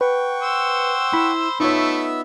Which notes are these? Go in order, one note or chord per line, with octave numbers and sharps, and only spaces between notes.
B4 F#5 G5 C#6
C5 E6
E4 B5
A3 B3 D#4 F4 C#5 E5 E6